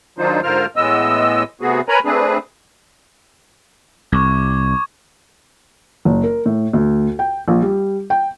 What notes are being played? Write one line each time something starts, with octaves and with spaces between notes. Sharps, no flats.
D#3 F#3 D4 D#4 F4 C5
G#2 D3 F4 A#4 C5 F6
A2 E3 G#3 B3 D#5 E6
C3 A3 B3 F#4 G#4
A#4 B4 C#5 G#5 A#5 B5
A3 C4 D4 G#4 B4
C2 C#6 D6 G#6
F#1
A#4
A2
D2
G5
A#1
G3
G5